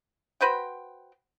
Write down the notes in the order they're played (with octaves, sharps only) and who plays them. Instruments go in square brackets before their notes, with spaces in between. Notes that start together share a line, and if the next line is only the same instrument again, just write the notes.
[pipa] F#4 B4 C5 G5